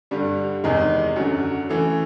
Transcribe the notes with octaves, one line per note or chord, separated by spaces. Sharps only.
G2 D3 G3
E2 C3 D#3 G#3
F#2 D3 F#3
C#3 E3 A3